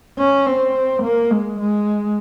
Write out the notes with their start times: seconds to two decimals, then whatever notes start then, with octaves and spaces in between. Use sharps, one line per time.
0.19 C#4
0.46 C4
1.02 A#3
1.30 G#3
1.60 G#3